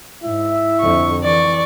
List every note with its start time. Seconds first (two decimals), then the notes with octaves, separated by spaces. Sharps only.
0.23 G#2 E4 E5
0.80 F2 D3 C#6
1.24 E3 D5 C#6